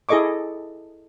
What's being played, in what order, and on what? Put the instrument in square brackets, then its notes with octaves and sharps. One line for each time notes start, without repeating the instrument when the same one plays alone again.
[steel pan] E4 G#4 A4 D#5 C#6 D6